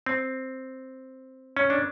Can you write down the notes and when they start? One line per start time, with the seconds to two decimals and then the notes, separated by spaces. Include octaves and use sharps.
0.06 C4
1.57 C#4
1.70 D4